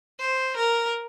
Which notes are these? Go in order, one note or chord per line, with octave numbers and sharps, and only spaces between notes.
C5
A#4